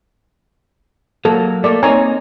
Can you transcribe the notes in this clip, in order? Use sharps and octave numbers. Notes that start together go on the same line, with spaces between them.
F#3 A#3 A4
A3 A#3 A4 D5
A#3 C4 D#4 C#5 G#5 A#5